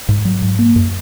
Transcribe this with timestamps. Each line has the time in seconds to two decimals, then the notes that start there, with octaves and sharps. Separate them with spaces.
0.09 G#2
0.25 F#3
0.42 G#2
0.59 A#3
0.76 F#2